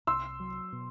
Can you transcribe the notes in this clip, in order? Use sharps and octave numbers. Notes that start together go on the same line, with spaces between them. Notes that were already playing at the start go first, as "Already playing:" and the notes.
C2 C6 E6
F#3
B2